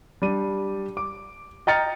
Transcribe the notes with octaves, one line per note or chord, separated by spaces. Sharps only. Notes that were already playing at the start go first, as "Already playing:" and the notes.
G3 D4 D#7
D6
D#5 G5 A#5 F6 A6 C#7